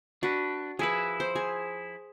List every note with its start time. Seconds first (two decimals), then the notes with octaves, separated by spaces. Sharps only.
0.23 D4 F#4 B4
0.79 F3 E4 G#4 B4
1.20 C5
1.35 G#4